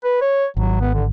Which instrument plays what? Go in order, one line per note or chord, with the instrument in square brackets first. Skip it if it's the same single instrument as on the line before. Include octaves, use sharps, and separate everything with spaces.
[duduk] B4
C#5
[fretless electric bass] G#1 [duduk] F#3
[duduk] B3
D3